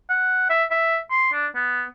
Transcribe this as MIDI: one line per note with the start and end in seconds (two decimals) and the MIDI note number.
0.09 0.48 78
0.49 0.64 76
0.70 0.98 76
1.10 1.29 84
1.33 1.47 62
1.55 1.84 59